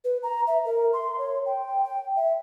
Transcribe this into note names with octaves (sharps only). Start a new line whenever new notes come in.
B4
A#5
E5
A#4
C6
C#5
G5
G5
E5